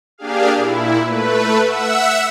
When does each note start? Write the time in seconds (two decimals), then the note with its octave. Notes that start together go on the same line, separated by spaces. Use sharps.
0.18 A#3 D4 G4 G#4 F5
0.55 A#2 E4
1.03 A3 B4
1.62 E5 F#5 E6